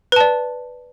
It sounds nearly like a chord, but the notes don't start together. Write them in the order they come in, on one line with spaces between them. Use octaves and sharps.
B4 A5 D5